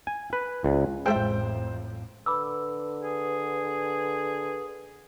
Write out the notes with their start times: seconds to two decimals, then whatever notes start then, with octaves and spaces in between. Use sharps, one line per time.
0.07 G#5
0.33 B4
0.64 C#2
1.06 A1 F2 A2 G#3 A4 C5 E5 G5
2.26 D3 B4 B5 D6 E6
3.02 G#4